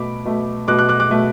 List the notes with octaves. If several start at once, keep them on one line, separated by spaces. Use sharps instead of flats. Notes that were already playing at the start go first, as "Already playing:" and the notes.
Already playing: B2 A3 B5 D6
B2 A3
B2 A3 D6 F#6
D6 F#6
D6 F#6
D6 F#6
B2 A3